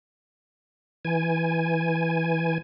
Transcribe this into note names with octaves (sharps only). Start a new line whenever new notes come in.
E3 G#5